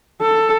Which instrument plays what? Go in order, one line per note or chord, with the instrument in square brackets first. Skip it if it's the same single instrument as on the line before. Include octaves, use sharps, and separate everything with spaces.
[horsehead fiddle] A4